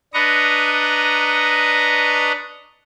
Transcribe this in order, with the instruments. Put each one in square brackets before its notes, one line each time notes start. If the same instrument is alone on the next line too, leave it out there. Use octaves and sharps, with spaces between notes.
[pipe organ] D4 B4 D#5 A#5 C#6